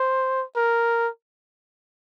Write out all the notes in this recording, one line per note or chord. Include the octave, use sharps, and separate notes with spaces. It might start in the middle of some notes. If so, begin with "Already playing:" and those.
Already playing: C5
A#4